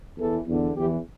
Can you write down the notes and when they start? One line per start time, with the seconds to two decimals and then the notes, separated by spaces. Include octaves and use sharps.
0.17 E2 E3 A4
0.46 E2 D3
0.75 E2 E3 G4